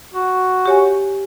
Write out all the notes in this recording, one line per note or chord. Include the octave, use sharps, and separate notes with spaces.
F#4
G4 C#5 G#5